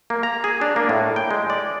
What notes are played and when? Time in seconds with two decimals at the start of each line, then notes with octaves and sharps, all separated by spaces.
0.10 A#3
0.23 A#5
0.44 G#4
0.61 D4
0.76 A#3
0.89 A2
1.16 G5
1.31 G#3
1.50 D5